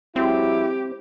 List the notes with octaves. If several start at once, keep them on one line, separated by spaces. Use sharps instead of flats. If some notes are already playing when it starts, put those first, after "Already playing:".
F#3 G#3 C4 E4 G4